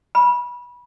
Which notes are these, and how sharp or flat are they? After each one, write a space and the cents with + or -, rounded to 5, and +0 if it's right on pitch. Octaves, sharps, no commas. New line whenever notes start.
B5 -20